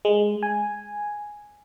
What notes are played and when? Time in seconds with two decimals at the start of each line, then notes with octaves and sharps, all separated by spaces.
0.05 G#3
0.43 G#5